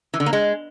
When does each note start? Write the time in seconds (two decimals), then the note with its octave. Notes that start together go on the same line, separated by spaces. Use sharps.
0.14 E3
0.20 D3
0.26 A#3
0.33 G#3